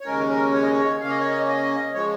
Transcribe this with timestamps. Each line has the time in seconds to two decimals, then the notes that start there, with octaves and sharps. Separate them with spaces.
0.01 C#5
0.06 D#2 C#3 G#3 C#4 A#4
0.30 A#4
0.54 C#5
0.62 D#5
0.73 C#5
1.00 C#3 A#3 C#4 F5
1.10 D#5
1.20 C#5
1.30 D#5
1.47 D#5
1.94 F3 G#3 C#5